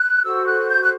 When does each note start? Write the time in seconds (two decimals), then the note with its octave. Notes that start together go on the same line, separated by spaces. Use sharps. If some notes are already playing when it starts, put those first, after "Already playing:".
Already playing: F#6
0.24 F#4 A4 C5 E6
0.45 F#6
0.68 G6
0.82 F#6